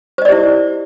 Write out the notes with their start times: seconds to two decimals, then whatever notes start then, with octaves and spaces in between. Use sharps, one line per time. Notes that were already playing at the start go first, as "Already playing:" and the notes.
0.18 C5
0.22 D#5
0.25 D5
0.29 G4
0.32 E4